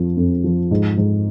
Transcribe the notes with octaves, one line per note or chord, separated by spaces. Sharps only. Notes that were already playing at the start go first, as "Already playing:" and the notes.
Already playing: F2 F3
F2
F3
G#2
G#2